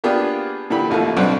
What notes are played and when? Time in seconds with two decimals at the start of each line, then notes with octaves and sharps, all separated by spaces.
0.04 A#3 B3 D4 F4 G4 G#4
0.70 A#2 D3 E3 G4 B5
0.90 A1 D#2 F3 A3
1.17 B1 G2 C4 D4 F#5